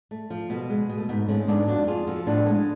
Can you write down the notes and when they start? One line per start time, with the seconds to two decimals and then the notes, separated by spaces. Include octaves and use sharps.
0.11 A3
0.30 F3
0.50 B2 B3
0.70 G#3
0.89 B2
0.98 A3
1.09 G#2 B3
1.28 G#3 A3 C#4
1.48 G#2 B3 D4
1.67 F2 D4 F#4
1.87 F2 F4 G#4
2.07 F3 F#4 A4
2.27 A2 B3 D4
2.46 G#3